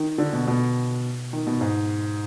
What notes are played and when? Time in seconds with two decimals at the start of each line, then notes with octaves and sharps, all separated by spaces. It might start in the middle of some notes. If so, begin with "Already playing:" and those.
Already playing: D#3
0.18 D3
0.33 B2
0.47 B2
1.33 D#3
1.47 B2
1.61 G#2